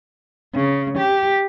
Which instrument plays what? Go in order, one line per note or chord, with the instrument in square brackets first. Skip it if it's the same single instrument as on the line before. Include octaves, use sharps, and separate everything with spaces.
[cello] C#3
G4